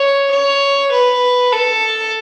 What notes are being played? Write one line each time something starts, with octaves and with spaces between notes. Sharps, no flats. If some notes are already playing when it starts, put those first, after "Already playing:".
Already playing: C#5
C#5
B4
A4